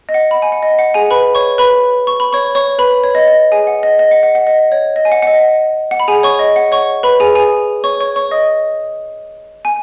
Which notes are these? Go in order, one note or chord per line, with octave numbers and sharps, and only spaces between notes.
D#5
F#5
B5
G#5
F#5
D#5
F#5
G#4 G#5
B4 B5
C#5 C#6
B4 B5
C#6
B5
C#5 C#6
C#5 C#6
B4 B5
C#5
D#5
D#5
G#4 G#5
F#5
D#5
D#5
F#5
F#5
F#5
D#5
C#5
D#5
G#5
F#5
F#5
D#5
F#5
B5
G#4 G#5
C#5 C#6
D#5
F#5
C#5 C#6
B4 B5
G#4 G#5
G#4 G#5
C#5 C#6
C#5 C#6
C#5 C#6
D#5 D#6
G#5